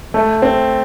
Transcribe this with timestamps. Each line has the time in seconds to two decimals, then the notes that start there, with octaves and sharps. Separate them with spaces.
0.14 A3
0.42 C4